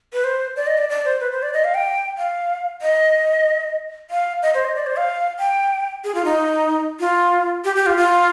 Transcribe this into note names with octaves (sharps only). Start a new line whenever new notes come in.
B4
C5
D5
D#5
D5
D5
C5
B4
C5
D5
D#5
F5
G5
F5
D#5
F5
D#5
C5
D#5
D5
C5
F5
G5
G#4
F4
D#4
F4
G4
G4
F4
F4